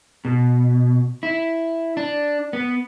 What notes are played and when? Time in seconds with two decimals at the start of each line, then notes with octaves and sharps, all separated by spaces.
0.25 B2
1.23 E4
1.97 D4
2.53 B3